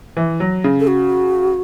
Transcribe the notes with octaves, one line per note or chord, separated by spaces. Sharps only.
E3
F#3
C#3
A4
F#4